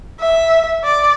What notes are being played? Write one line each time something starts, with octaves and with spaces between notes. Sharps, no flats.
E5
D5